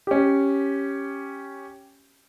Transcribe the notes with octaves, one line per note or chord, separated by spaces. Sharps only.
C#4 G4